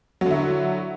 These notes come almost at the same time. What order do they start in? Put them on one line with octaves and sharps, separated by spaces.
F#3 D3 E4